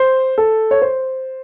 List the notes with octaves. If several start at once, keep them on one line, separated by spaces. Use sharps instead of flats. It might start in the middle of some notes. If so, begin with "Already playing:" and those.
Already playing: C5
A4
C#5
C5